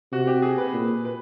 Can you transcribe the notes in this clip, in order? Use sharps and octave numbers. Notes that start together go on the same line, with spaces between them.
C3 F#4
G4
G#4
B4
A#2
B4